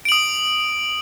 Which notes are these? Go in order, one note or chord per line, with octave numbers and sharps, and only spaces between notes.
D#6 D7 F#7